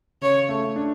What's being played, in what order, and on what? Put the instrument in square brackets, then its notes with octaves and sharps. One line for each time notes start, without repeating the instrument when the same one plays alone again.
[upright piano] C#3 [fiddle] C#5
[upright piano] A3
D4